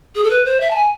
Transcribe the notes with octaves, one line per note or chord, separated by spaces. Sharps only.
G#4
A4
B4
C5
E5
A5
G#5